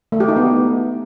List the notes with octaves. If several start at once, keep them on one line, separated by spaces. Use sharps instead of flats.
A3
G4
D#4
B3